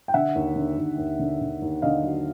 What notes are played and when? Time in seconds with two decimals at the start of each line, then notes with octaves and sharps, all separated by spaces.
0.08 G5
0.14 D3 E5 F#5
0.35 D#2
0.56 D3
0.77 D#2
0.98 D#2
1.19 D3
1.41 D3
1.62 D#2
1.82 D3 D#5 F5
2.04 F#3